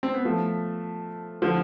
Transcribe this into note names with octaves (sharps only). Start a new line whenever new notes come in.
C4
B3
F3 A3
D3 F3